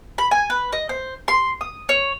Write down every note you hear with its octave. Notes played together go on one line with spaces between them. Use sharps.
B5
G#5
B4
D#5
C5
C6
D#6
C#5